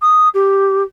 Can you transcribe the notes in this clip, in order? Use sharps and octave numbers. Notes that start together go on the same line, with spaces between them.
D#6
G4